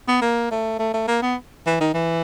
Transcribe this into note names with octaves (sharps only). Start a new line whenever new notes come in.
B3
A#3
A3
A3
A3
A#3
B3
E3
D#3
E3